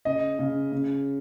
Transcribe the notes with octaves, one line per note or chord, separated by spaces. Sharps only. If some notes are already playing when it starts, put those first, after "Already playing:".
C#3 D#5
C#3
C#3